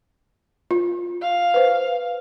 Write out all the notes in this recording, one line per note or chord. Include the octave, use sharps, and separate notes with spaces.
F4
F5
B4 C5